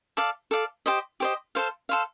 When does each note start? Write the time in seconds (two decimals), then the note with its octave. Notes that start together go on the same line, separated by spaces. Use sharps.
0.17 A4 D5 F5
0.51 A4 D5 F5
0.86 G4 C5 D#5
1.20 G4 C5 D#5
1.55 A4 C5 F5
1.89 A4 C5 F5